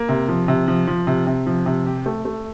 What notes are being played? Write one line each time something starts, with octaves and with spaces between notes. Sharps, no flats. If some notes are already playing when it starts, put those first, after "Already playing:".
Already playing: A#3
C3
F3
C3
F3
F3
C3
C3
F3
C3
G4
A3
A3